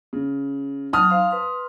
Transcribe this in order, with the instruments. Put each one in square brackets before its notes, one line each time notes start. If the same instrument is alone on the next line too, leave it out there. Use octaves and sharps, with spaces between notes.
[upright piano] C#3
[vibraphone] F#3 D#4 [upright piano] A5 D#6 F6
[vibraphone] C5 F5 C6
B4 C6